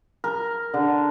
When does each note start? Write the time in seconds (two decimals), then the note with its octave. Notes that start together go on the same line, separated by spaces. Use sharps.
0.24 A#4
0.74 D3